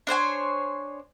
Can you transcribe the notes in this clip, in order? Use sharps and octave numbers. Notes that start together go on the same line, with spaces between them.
D4 C5 C#5 G#5